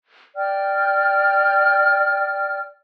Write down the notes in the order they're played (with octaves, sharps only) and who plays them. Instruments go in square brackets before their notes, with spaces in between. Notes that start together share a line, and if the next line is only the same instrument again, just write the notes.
[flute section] D5 G5 F6